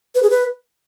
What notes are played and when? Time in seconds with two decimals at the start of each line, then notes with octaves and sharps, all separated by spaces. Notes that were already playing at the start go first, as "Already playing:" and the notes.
0.15 B4
0.23 G#4
0.30 B4